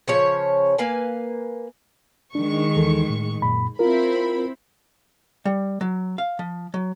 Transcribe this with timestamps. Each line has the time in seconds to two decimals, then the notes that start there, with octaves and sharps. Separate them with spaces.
0.08 C#3 F3 C#5
0.78 A#3 B4 F5 G#5
2.35 D#3 G#3 D4 C#6
2.76 D#2 E3 A4
3.10 A2
3.42 F#2 A#2 B5
3.79 C4 E4 F4 A#4 B5
5.45 G3
5.81 F#3
6.18 F5
6.39 F3
6.74 F#3